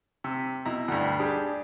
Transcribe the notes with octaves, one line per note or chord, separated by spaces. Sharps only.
C3
B2 E4 A#5
D2 G2
D4 G4 G#4